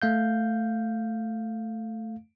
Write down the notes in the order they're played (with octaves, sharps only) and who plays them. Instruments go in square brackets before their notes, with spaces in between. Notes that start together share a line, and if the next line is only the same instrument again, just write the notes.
[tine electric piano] A3 F5 G6